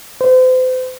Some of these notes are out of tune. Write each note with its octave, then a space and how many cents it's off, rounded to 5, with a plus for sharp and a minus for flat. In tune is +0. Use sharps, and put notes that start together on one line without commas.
C5 -40